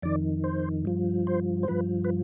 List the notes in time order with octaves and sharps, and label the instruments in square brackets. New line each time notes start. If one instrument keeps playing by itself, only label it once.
[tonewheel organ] F2 D#3 D5
C5
G2 F3
C5
C5
G2 F3 B4
B4